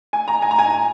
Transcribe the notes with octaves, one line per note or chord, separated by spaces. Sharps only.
G#5
A#5
G#5
A#5
G#5